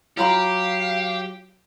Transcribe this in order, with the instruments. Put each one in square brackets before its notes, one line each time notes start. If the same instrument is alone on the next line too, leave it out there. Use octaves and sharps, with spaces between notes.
[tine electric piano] F#3 [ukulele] F4 A#5 B5 [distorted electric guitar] G4 [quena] F5